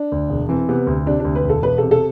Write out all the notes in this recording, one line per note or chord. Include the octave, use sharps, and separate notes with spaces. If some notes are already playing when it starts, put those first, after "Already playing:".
Already playing: D4
D2
E1
E3 C4
C3 B3
D2
C3 D4
D2 D4
B4
E1
A4
E1 B4
C3 A4
A4